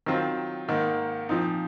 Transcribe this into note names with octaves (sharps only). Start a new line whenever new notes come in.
D#3 F#3 C4 F4
G#2 D#3 A#3
A#2 F3 C4 D#4